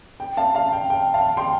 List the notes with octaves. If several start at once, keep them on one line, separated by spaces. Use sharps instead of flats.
G5
F5 A5
F5 A5
G5
G5
F5 A5
G5 C6